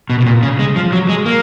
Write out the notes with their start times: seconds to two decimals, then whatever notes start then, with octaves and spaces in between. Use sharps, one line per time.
0.10 B2
0.20 B2
0.26 A#2
0.43 C#3
0.59 G#3
0.76 F3
0.92 F#3
1.09 G#3
1.26 A#3